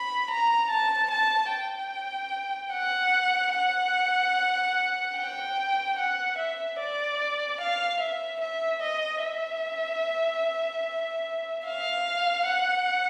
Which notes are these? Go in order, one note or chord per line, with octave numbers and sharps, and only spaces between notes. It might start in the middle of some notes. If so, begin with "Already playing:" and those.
Already playing: B5
A#5
A5
A5
G5
F#5
F#5
G5
F#5
E5
D5
F5
E5
E5
D#5
E5
F5
F#5